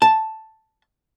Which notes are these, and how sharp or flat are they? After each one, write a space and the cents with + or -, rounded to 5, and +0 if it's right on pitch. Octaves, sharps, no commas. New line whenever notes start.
A5 +0